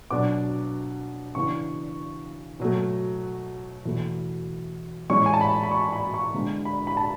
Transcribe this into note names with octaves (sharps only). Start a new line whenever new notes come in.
B2 F#3 B3 D4 D6
C#3 E3 B3 D4 C#6
B2 F#3 A3
E2 B2 A3 E4
A2 E3 G#3 C#4 E4 C#6
G#5
A5
B5
B5
C#6
B5
C#6
D3 G#3 B3
B5
B5
A5